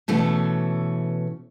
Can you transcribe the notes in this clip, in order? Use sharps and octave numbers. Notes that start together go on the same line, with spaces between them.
B2 E3 A3 C#4